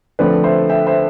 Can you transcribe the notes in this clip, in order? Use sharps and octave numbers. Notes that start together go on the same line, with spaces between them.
D3 F3 A3 C4 B4 D5
C5 E5
E5 G5
C5 E5